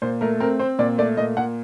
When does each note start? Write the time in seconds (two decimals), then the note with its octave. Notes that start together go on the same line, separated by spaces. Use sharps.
0.02 A#2 C5
0.21 A3 A#4
0.40 C4 A#4
0.59 C4 C5
0.79 A#2 D5
0.98 A3 D5
1.17 A#2 D#5
1.37 A#2 F#5